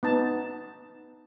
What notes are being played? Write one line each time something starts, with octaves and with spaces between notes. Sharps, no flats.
B3 D#4 A5